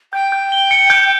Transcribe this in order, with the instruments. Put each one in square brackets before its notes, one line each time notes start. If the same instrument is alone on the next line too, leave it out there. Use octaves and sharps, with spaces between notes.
[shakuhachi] G5 [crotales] G6
[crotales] G6
G7
C#7
G6